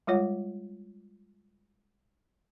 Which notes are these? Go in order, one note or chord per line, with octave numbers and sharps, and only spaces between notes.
G3 G#3 F4 C#5 F#5